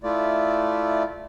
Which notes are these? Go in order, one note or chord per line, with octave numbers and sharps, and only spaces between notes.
A3 E4 F4 D5